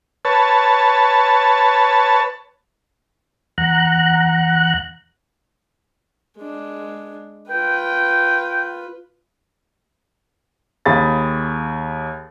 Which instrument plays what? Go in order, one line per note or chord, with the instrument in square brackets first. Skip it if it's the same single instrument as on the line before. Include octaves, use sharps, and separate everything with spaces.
[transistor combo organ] B4 C#5 A5
[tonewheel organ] E2 F#5 A#5 F#6
[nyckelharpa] G#3 D4
[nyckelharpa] F4 B4 [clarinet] G5
[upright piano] D#2 G#4 B5 A6